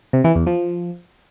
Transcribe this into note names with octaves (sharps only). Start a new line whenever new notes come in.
C3
E3
E2
F3